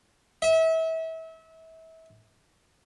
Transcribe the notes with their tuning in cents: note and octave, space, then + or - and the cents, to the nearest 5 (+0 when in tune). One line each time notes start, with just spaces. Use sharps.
E5 -30